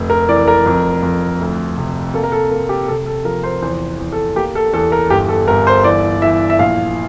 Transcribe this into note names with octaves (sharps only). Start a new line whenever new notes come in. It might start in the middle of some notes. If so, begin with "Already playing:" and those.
Already playing: F1
A#4
E3 D5
A#4
F2
F2
D2
C3
A#3 A4
A#4
A4
A#3
G4
C3 A4
A4
F3 A#4
C5
E2 C5
E2
A4
A#3 G4
A4
E2 A4
A#4
G1 G4
A4
G1 A#4
C5
E3 D5
E3 E5
E5
A#1 F5